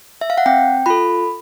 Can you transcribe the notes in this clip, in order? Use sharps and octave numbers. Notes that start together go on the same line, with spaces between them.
E5
F5
F#5
C4 G5
F4 A4 B5